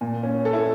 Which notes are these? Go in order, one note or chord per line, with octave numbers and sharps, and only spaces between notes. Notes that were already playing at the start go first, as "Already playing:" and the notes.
A#2
C#4
A4
E4